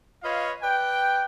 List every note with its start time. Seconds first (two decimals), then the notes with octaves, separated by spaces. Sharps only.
0.23 F4 B4 C#5 D#5 F5
0.63 B4 D5 G5